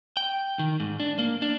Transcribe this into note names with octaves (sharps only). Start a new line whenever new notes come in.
G5
D#3
G#2
D4
A#3
D4